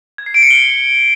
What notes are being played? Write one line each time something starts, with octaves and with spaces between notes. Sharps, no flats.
G#6
C7
D7
C#7
G7